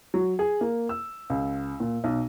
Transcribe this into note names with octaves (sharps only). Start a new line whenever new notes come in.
F#3
G#4
A#3
E6
C#2
A#2
B1